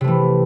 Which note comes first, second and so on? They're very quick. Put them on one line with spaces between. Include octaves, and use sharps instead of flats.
C3 A3 E3